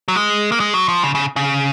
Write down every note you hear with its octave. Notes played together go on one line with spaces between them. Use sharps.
F#3
G#3
A#3
G#3
F#3
F3
C#3
C#3
C#3